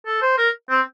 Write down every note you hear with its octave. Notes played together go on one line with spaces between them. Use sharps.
A4
C5
A#4
C4